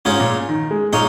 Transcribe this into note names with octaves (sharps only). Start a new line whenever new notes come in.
G#2 C#4 F4 G#4 C#5
A#2
D#3
G#3
A#2 G#3 D#4 C#5 F5